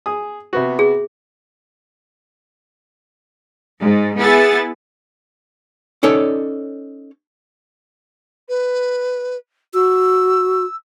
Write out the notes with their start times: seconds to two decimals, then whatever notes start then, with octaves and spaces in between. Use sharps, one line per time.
0.06 G#4 D#6
0.53 C3 B3 F#4
0.79 G#4
3.80 G#2
4.18 B3 E4 G#4 A6
6.03 C#4 D#4 A4 C#5 D5
8.49 B4
9.74 F#4 E6